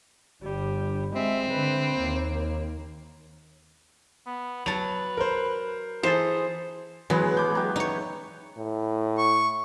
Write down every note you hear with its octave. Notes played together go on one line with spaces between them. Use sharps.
G1 G3
G#3 C4 E5
D3 B4
D#2 A#3
B3
F#3 B4 A5 F7
A#4 C5
E3 G#4 A4 C5
E3 F#3 G#3 B3 G#4
G#3 D6 G6
F#3 G4 E5
D#4 C#5 E5
A2
C#6